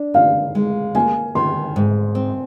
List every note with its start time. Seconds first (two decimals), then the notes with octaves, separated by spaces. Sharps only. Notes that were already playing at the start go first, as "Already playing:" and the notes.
Already playing: D4
0.14 D#4 F5
0.55 G#3
0.95 A#3 G#5
1.35 D#3 C6
1.76 G#2
2.15 C4